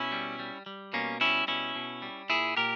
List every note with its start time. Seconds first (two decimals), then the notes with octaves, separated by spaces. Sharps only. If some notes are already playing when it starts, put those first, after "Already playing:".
Already playing: B2 C#4 E4
0.12 G3
0.39 G3
0.66 G3
0.93 B2 A#3 C#4
1.21 G3 C#4 E4
1.48 B2 C#4 E4
1.76 B2
2.02 G3
2.30 A#2 E4 G#4
2.57 A#2 G4 A#4